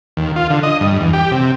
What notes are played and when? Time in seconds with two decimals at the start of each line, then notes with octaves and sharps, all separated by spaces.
0.17 D#2
0.36 F4
0.50 D3
0.63 D#5
0.81 G2
1.01 E2
1.13 G4
1.32 C3